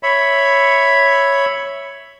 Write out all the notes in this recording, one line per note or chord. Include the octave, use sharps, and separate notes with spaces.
C#5 E5 B5